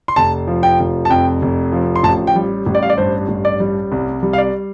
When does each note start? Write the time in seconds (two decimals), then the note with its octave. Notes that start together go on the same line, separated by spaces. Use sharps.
0.08 C6
0.16 F1 A5
0.47 F3
0.63 G5
0.80 F1
1.05 A5
1.10 F2 G5
1.42 F1
1.72 F3
1.96 C6
2.03 A1 A5
2.27 G5
2.36 G3
2.66 A1
2.75 D5
2.83 F5
2.90 D5
2.98 G2 C5
3.28 A1
3.45 D5
3.60 G3
3.92 C2
4.23 G3
4.33 F5
4.38 D5